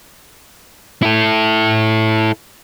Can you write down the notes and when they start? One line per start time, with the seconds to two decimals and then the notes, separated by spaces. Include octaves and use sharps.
1.03 E4 A4